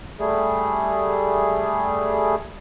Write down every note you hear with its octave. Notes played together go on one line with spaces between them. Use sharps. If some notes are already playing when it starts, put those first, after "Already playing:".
G3 A3 G#4